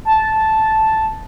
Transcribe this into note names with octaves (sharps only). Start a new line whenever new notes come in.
A5